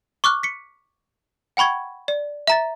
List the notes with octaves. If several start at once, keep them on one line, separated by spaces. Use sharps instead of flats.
C#6 D6 F6 F#6
B6 C#7
F#5 G5 B5 C#6 G#6
D5
E5 A#5 A6